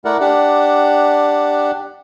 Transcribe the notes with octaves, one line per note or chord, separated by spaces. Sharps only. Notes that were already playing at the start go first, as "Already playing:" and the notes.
A3 E4 A#4 D5 F#5
D4 G4 D5 F#5